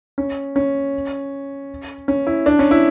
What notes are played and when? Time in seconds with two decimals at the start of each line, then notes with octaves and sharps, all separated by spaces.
0.18 C#4
0.56 C#4
2.08 C#4
2.27 E4
2.46 D4
2.59 C#4
2.71 E4